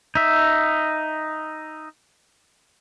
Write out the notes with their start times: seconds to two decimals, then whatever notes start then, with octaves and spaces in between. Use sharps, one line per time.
0.15 D#4 E5